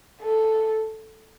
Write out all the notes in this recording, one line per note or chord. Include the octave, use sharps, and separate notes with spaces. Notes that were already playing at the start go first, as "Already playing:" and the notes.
A4